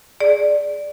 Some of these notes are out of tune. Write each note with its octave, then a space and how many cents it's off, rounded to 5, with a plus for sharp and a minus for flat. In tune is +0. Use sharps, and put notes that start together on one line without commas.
G#4 +10 D5 +0